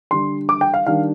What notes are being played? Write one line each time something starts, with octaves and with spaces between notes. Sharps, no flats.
D3 G3 D4 C6
D6
G5
F5
D#3 G3 D4 F5